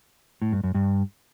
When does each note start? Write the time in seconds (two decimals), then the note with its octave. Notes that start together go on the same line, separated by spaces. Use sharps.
0.42 A2
0.53 G2
0.64 F#2
0.75 G2